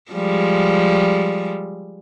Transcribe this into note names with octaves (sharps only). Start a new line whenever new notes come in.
F3 G3 G#3